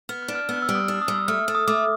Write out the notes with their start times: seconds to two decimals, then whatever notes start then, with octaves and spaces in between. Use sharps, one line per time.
0.09 B3 F6
0.22 F6
0.28 D4
0.35 F6
0.49 B3 E6
0.57 F6
0.62 E6
0.69 G3
0.75 D#6
0.88 D4
1.02 D#6
1.08 G3
1.15 E6
1.28 A3 F6
1.48 A3
1.55 D#6
1.67 A3 D6